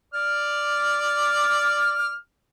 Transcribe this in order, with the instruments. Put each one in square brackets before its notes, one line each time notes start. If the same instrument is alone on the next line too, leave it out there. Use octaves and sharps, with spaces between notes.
[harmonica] D5 D6 F6